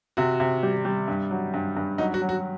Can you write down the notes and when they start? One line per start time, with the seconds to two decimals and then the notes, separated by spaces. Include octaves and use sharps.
0.17 C3 F#4
0.40 C3
0.63 G3
0.85 G3
1.08 G2
1.31 F#3
1.54 G2
1.77 G2
1.98 F#3 D#4
2.14 F#4
2.22 F#3
2.29 F#4